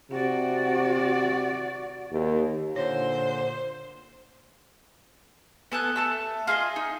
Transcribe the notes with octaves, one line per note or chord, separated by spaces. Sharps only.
C3 F#4 D5
D#2
A#2 D3 C5 C#5
B3 A4 G#5 F#6
A3 A5 E6
F4 G#4 A4 D#5
D#4